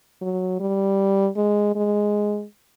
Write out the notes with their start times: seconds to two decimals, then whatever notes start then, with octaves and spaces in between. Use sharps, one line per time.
0.22 F#3
0.60 G3
1.36 G#3
1.75 G#3